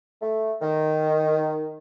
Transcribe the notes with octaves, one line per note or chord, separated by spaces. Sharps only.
A3
D#3